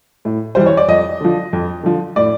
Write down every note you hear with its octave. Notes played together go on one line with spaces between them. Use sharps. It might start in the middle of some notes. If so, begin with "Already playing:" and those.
A2
E3 G3 C5
C#5
D5
F2 D#5
D3 F3
F2
D3 F3
A2 D5